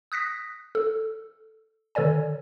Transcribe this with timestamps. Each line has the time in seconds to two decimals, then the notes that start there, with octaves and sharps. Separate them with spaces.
0.12 D#6 F#6 A#6 B6
0.75 A4
1.95 D3 D#3 A4 C#5 D5 G#5